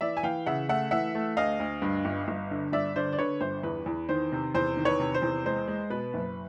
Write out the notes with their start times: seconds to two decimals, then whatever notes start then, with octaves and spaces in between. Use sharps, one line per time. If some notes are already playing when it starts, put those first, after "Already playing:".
0.01 E3 D5 E5
0.17 G#5
0.23 E3 F5 G5
0.46 C#3 E5 F#5
0.69 A3 E5 F#5
0.91 E3 E5 F#5
1.15 A3
1.37 D2 D#5 F5
1.60 D2
1.82 G2
2.05 G1
2.28 G1
2.51 D3
2.72 G1 D5 E5
2.96 D3 C5 D5
3.13 D5
3.19 D3 B4 C#5
3.41 G1 C5
3.63 E2 B4
3.86 E2
4.09 D#3 C5
4.32 C3
4.55 E2 C5
4.77 D#3
4.85 B4 C#5
5.00 C3
5.14 C5
5.22 E2
5.45 G#3 C5
5.68 G#3
5.90 B2 B4
6.14 F#1